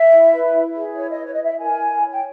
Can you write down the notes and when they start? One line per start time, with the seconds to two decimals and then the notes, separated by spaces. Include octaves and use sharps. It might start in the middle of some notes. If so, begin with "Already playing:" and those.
Already playing: E5
0.11 E4
0.32 B4
0.53 E4
0.75 G#4
0.95 E4 C#5
1.11 D#5
1.17 B4
1.26 C#5
1.34 E4 D#5
1.43 E5
1.59 A#4 G#5
1.80 E4
2.02 C#5
2.12 G5